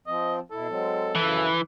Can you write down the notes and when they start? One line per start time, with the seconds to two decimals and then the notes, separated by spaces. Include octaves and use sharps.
0.07 F3 C4 D#5
0.52 B2 E4 A4
0.68 F#3 G#3 C4
1.15 F#2 C#3 E3